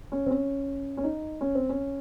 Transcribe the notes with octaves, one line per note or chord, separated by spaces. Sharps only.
C#4
C4
C#4
C#4
D#4
C#4
C4
C#4